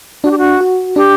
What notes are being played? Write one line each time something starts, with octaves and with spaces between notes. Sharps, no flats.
D4 F#4
G4
F#4
F#4
D4 G4